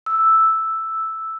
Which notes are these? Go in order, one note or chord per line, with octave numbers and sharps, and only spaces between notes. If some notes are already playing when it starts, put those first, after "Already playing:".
E6